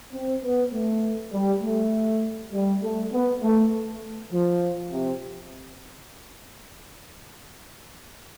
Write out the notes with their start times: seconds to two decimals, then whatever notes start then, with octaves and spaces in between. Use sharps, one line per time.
0.14 C4
0.44 B3
0.73 A3
1.33 G3
1.63 A3
2.53 G3
2.83 A3
3.12 B3
3.43 A3
4.32 F3
4.92 C3